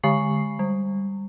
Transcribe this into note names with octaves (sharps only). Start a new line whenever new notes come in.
D3 G#3 G#5 C#6 C7
G3